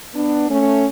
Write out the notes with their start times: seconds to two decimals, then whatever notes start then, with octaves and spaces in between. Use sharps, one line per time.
0.15 B3 D4
0.49 A3 C#4